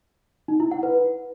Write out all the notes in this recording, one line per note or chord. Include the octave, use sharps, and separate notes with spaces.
D#4
E4
F#5
B4